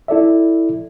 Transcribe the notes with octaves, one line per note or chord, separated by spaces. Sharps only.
E4 A4 D5 E5